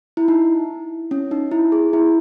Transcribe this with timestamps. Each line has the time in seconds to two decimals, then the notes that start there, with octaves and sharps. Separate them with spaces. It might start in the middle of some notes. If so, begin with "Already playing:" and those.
0.17 E4
0.28 D#4
1.11 C#4
1.31 D#4
1.51 E4
1.72 G#4
1.93 E4